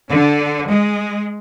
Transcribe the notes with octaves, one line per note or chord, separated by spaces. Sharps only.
D3
G#3